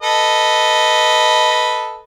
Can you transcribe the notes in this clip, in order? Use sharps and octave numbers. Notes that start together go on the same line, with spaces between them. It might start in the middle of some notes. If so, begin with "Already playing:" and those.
A4 B4 D#5